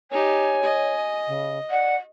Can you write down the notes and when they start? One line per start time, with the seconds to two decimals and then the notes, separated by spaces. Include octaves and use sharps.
0.11 D#4 G4 C#5 G#5
0.63 D#5
1.27 C#3
1.71 D5 F#5